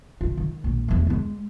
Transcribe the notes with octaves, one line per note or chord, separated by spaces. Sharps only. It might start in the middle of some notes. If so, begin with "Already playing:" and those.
F4
D#3
A#1
E2 A3
G2 G#3